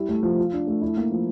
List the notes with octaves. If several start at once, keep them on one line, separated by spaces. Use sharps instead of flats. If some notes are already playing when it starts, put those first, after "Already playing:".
Already playing: G3 E4
A3
F3
F4
D4
A3
E4
A#3
F3